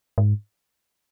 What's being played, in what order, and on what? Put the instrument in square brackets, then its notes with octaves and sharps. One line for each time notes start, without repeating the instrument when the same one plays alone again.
[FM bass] G#2